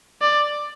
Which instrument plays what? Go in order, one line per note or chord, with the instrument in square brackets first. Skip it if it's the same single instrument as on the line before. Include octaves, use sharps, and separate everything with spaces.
[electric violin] D5